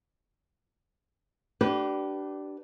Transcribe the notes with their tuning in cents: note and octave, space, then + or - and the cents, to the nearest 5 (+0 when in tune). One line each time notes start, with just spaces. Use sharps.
D4 +0 G4 -35 B4 +0